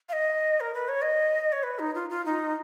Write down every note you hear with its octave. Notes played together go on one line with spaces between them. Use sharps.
F5
D#5
A#4
B4
C#5
D#5
C#5
B4
D#4
F4
F4
D#4